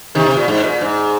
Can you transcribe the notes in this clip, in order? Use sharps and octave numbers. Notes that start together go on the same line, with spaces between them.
C3 D#3
C3
A#2
G#2
A#2
G#2